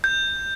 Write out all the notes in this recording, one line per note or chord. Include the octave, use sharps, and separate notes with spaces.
G6